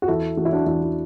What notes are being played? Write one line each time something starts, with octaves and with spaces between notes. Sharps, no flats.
F#4
E2 E4 A4
E3 F#4
E4
D4 F#4
E2 E4
F#4